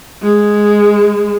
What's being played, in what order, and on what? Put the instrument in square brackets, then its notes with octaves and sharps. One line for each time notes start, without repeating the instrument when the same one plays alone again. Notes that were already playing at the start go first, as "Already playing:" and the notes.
[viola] G#3